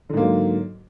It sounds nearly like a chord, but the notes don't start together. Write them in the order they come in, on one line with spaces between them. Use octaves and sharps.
D3 G#2 A#3 F#3